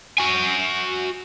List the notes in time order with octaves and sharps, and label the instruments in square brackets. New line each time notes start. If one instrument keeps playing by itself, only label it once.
[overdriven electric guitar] F#4 G#5